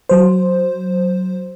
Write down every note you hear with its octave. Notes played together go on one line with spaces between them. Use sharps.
F#3 C5